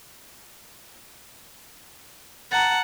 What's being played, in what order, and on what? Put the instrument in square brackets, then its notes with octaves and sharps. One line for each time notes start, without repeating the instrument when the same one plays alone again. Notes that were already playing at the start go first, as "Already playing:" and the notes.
[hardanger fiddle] F#5 A5 [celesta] A#5 A6